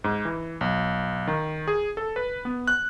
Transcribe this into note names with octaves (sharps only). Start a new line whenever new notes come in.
G#2
E3
B1
D#3
G#4
A4
B4
B3
F#6